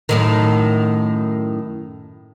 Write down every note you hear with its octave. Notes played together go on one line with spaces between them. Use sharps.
F#2 A2 D#3